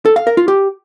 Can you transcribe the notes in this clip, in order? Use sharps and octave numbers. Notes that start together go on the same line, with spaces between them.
A4
F5
A#4
F4
G4